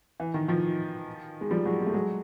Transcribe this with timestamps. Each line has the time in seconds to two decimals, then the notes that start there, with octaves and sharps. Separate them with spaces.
0.20 E3
0.34 D#3
0.48 D#3 F3
1.41 G#3
1.51 F3 G3
1.65 F#3 G#3
1.81 G#3
1.87 A3
1.94 F#3 G#3